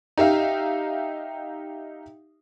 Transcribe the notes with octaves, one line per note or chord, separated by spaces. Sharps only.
D#4 G4 E5 F5